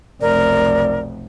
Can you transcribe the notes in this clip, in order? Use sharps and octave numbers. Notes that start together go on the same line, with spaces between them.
F1 B1 A#4 D5